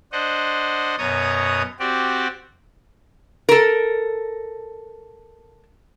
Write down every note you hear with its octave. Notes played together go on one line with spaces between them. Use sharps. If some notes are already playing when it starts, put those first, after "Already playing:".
D4 C5 D#5 F#5
F#2 B2 B3 C#5 A#5 D#6
C4 F#4 G4 D5
A4 A#4